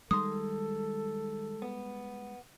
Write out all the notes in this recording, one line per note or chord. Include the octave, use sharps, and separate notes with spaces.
D#3 G3 G#3 D#4 A4 C6 D#6
B3